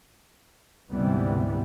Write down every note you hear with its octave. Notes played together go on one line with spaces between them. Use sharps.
D2 G#2 C3 E3 G3 B3